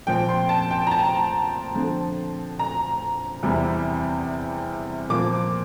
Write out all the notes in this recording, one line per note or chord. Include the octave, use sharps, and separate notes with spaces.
A#2 F3 C4 G5
C6
A5
G5
A#5
A5
D3 F3 C4
A#5
E2 C3 G3 C4 E4
A#2 F3 A#3 D6